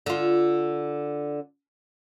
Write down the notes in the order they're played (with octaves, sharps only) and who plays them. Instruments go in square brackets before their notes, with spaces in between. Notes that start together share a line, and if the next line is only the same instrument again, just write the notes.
[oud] D3 F4